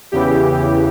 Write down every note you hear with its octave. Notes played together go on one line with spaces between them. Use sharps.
E2 C#3 E3 G4